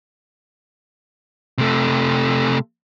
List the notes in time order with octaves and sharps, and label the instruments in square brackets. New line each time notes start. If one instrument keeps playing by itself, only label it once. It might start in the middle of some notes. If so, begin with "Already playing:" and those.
[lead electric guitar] C3 A3